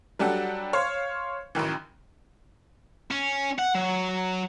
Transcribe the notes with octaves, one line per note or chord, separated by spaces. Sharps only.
F#3 G3 D4 A4 F#5
C5 C#5 F5
A1 F#2 D#3 E3
C#4
F#5
F#3